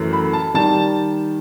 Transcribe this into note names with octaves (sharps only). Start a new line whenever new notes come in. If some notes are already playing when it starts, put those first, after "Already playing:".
Already playing: F#2 E3 A3
B5
A5
D#3 G3 A5